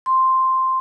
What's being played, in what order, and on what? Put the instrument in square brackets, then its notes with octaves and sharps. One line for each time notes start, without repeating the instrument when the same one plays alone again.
[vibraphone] C6